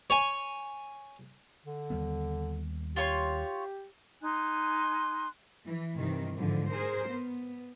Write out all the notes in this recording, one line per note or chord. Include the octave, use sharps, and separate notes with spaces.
C#5 G#5
D3
D#2 G3 B3
F4 G4 C#5 C6
D#4 G#5 C6 F#6
E3
G2 C3 D#3 E3
G#2 D3 E3 F3
G#4 A#4 C5
B3